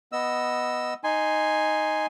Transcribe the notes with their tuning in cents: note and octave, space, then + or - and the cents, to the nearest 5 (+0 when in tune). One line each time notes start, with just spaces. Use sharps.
B3 +0 D#5 +0 E6 +0
D#4 +0 G#5 +0 C6 -5